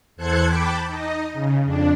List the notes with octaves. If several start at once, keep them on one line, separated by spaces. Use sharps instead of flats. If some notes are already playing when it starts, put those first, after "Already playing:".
E2 A4 C5 F#6 G#6 C#7
G5 A5 B5 D6
D#4 D#5
C#3
F2 D4